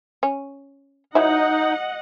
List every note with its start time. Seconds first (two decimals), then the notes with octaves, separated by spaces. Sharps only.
0.23 C#4
1.15 E3 F#3 D#4 E4 D#5 F#5